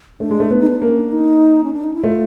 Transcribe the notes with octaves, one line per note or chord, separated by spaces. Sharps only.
A3 D4
G#3
A3
B3
D#4
D4
A#3
C#4
D4
D#4
C#4
D4
D#4
E4
A3 F4